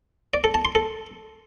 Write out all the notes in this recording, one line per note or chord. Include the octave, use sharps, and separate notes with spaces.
D5
A4
A5
C6
A4